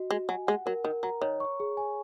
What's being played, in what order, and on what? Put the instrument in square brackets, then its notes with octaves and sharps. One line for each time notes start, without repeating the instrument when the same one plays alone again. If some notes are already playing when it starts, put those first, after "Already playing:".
Already playing: [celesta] F#4 D#5
[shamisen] G#3 [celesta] F#4
[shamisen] F#3 [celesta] G#5
[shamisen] G#3 [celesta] F#5
[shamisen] F#3 [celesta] A#4
[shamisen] D#3 [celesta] A#4
[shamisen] F#3 [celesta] A#5
[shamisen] D#3 [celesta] C#5
[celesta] C#6
G#4
G#5